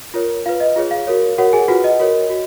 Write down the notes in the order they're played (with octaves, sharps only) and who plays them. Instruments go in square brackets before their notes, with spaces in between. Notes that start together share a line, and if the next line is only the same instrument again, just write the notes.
[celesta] F4 A#4 C#5
F4 B4 F5
D#5
F4 G#4 C#5
F5
F#4 A#4 C#5
F#4 A#4 C#5 F#5
G#4 G#5
F4 F#4 B4 F#5
D#5
F#4 A#4 C#5
F#4